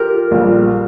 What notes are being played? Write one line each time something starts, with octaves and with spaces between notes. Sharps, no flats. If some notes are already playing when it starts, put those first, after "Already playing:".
Already playing: F4 G4 A#4
A#1 A#2 G3